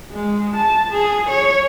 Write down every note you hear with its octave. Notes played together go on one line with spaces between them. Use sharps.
G#3
A5
G#4
C#5